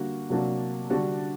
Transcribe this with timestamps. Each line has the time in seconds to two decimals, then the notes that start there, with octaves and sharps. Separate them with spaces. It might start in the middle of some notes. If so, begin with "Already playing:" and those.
Already playing: D3 G3 A#3 F#4
0.29 C3 F#3 A#3 D4 F#4
0.90 D3 G3 D4 F#4